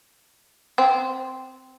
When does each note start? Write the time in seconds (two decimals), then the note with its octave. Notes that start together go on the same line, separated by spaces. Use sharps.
0.78 C4